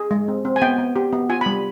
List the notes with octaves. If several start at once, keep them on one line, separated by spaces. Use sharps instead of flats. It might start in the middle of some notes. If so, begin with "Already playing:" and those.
Already playing: G#4
G#3
C4
C4
G#5
B3 G5
B3
G4
B3
F4 G#5
G3 B5